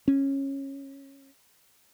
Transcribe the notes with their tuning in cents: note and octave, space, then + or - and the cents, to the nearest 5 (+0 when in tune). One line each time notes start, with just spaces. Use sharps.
C#4 -15